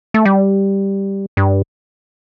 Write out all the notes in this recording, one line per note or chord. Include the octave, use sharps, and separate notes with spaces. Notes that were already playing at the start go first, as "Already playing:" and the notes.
A3
G3
G2